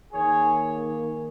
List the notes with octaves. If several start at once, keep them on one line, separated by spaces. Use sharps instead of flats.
D#3 A#3 G#4 C#5